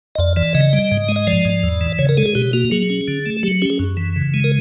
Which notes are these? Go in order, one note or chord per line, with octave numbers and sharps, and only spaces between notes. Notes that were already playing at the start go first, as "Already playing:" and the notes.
D#5
F2 D5
E3 D5
C#3 D#5
G3
G#2
G#3
D#5
F3 D5
G#2
E2
E3
C#3 C#5
A#4
G#3 A4
G#4
B2 G4
A#3 F#4
F#3 G#4
C#4
D3
A3
F#3 G4
C#4 G4
G#4
F#2
E3
C#3
G#3
A#4